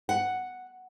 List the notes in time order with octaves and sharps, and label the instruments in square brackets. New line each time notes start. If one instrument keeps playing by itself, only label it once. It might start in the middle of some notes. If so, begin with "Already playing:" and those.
[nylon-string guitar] F#5